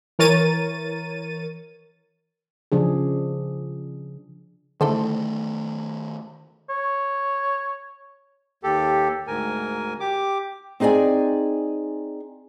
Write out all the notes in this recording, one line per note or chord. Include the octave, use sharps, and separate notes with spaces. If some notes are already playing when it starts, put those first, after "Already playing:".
E3 A#4 C#5 A6 D#7
C#3 F3 D4 G#4
D3 D#3 A3 E4 A4 C5
C#5
D#2 G4 A4
D2 G#2 A#4 G#5
G4 D6
C4 D#4 G#4 D5 G#5